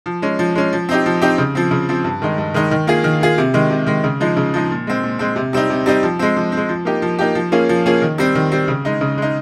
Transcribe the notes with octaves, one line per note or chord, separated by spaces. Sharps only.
F3
G#3 C#4
F3
G#3 C#4
F3
C4 D#4 G4
F3
C4 D#4 G4
C#3
F3 C4
C#3
F3 C4
G2
D#3 G#3 D#4
G2
D#3 G#3 D#4
D#3
A#3 F4 G#4
D#3
A#3 F4 G#4
C3
D#3 G#3
C3
D#3 G#3
C#3
F3 G#3 D#4
C#3
F3 G#3 D#4
A#2
G#3 C4
A#2
G#3 C4
C3
G3 C4 D#4
C3
G3 C4 D#4
F3
G#3 C4
F3
C4
G#3
F3
A#3 D#4 G4
F3
A#3 D#4 G4
F3
A#3 C#4 F4 G#4
F3
A#3 C#4 F4 G#4
D#3
G3 C4
D#3
G3 C4
C#3
G#3 D#4
C#3
G#3 D#4